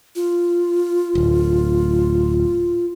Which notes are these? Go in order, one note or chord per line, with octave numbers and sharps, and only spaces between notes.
F4
D1